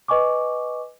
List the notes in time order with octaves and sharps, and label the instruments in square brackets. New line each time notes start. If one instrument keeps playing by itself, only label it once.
[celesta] B4 D#5 G#5 C#6 D6